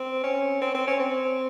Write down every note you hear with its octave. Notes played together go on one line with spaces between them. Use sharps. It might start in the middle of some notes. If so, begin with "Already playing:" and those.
Already playing: C4
C#4
C4
C4
C#4
C4